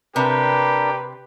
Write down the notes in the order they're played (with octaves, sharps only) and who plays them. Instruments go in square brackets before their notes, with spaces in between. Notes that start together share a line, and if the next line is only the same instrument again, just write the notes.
[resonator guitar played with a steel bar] C3 [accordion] D4 A#4 D5 [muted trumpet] G4 [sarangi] B4